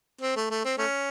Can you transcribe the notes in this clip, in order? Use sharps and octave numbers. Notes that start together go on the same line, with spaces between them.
C4
A3
A3
C4
A3 C#4